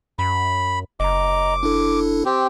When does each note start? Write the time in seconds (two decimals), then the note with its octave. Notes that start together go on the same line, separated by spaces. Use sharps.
0.19 F#2 B5
1.00 F#1 D#5 A#5 D6
1.63 D4 E4 A4
2.25 C4 G4